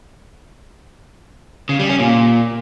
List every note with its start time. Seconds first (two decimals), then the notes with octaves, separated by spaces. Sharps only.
1.69 C#3
1.79 G3
1.89 C#4
1.99 A#2